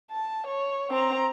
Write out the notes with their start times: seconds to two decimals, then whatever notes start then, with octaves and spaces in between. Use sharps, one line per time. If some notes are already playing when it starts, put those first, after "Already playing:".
0.11 A5
0.47 C#5
0.90 C4 A#5